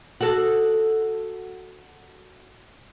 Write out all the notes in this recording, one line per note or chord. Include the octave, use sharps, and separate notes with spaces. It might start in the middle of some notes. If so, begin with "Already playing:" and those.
F#4 A4